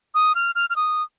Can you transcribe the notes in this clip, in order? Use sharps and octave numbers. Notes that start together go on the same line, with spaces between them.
D#6
F6
F6
F6
D#6